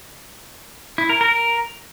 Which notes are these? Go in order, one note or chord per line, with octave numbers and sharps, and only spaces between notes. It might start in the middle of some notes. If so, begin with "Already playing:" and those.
E4
A#4
A#4